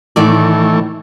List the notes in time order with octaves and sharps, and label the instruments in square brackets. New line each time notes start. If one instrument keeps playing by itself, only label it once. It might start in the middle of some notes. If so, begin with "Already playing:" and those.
[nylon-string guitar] A2 D#3 D5 [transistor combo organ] E3 A3